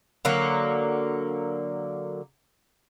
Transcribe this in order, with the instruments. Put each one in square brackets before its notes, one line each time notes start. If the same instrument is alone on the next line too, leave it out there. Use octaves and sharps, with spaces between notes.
[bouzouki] D3 F#3 A#3